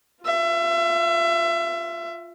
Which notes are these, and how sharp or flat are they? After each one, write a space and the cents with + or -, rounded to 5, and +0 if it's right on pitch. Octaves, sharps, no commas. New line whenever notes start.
F4 +0 E5 +30